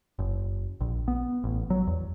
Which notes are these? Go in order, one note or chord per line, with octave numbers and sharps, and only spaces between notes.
F#1
A#1
B3
A1
F#3
E2